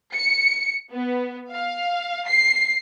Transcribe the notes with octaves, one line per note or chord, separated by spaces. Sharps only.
C#7
B3
F5
C7